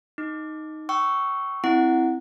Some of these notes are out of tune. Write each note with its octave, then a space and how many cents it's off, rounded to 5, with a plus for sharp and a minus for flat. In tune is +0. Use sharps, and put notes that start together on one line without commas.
D#4 +0 D6 +0
G5 -35 C#6 +0 E6 +0
C4 +0 E4 +0 F#5 +0